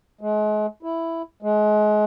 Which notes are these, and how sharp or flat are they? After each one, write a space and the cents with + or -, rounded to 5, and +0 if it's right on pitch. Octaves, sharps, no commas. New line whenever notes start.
G#3 +35
E4 +5
G#3 +30